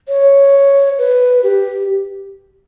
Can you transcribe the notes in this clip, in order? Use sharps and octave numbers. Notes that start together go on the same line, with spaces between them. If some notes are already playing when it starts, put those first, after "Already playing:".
C#5
B4
G4